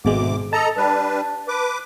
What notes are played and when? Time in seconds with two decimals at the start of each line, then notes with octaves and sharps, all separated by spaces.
0.05 G#1 D2 B2 G#3 D6
0.53 A4 D#5 A5 A#5
0.77 G3 D4 B4
1.48 B4 D6